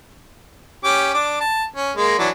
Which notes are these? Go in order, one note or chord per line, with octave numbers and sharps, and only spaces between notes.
C#4 G4 D6
D4 D6
A5
C#4
G#3 A#3
E3 F#3 D4